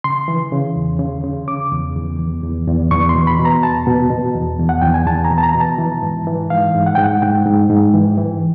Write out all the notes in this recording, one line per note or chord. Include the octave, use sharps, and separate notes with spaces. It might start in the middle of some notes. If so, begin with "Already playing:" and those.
C#3 C6
E3
C#3
E2
C#3
C#3
C#3 D6
E2
E2
E2
E2
E2
E2 C#6
C6
B2
B5
B2
A#5
E2 A5
B2
B2
E2
E2
F#5
E2 G5
G#5
E2 A5
A#5
B2
A5
A#5
B2 A#5
A5
E3
G#2
E3
G#2 F5
G#2
F#5
G#2 G5
F#5
G#2 G5
G#2
G#2
E3
E3